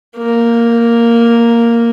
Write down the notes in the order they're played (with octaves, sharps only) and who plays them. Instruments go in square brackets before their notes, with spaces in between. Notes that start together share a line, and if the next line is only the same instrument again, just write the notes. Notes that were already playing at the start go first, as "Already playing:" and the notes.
[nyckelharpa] A#3